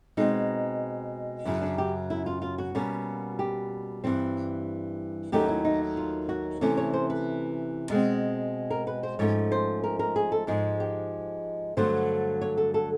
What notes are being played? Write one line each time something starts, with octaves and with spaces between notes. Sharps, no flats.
B2 G#3 C4 D#4
F#2 C#3 F#3 E4
D4
G4
E4
F4
F4
F#4
B2 G3 A#3 C#4
G4
G2 E3 G3 C4
D#2 D#3 F#3 A3 C#4 G4
E4
D#4
F4
F#4
C3 E3 A3 C#4
C#5
C5
B4
B2 G#3 C4
A#4
B4
C5
G#2 F3 A3 C#4 C#5
C5
A#4
A#4
G#4
A4
G#2 F3 G#3 G#4
G4
G2 D3 F#3 A3 C5
C#5
A4
A4